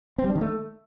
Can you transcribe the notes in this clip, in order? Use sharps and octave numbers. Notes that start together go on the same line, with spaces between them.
C4
G3
D4
D#3
A3